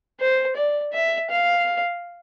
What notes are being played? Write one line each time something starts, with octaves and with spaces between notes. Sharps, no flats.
C5
D5
E5
F5